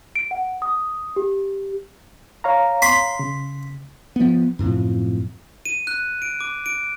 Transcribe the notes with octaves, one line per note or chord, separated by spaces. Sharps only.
D7
F#5
D#6
G4
C#5 F5 A#5
B5 C6
C#3
F3 B3
F#2 A2 C3 F3
D#7
F#6
D7
D6
D7